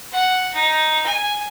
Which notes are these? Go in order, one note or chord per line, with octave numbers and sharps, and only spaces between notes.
F#5
D#4
G#5